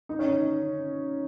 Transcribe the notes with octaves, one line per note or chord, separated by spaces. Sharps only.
D#4
C#4
D#4